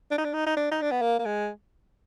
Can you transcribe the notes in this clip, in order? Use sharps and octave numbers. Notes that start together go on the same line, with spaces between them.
D4
D#4
D4
D#4
D#4
D4
D#4
D4
B3
A#3
A#3
G#3